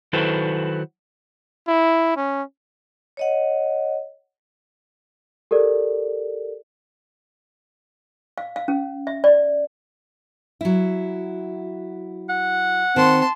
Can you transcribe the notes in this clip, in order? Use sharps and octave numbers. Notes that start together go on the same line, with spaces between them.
D#3 F#3 E4 A4 B4 C5
E4
C#4
C#5 D#5 F#5
G4 A4 A#4 D5
F5
F5
C#4
E5
D5
F#3 E4
F#5
D#3 C4 A5 C6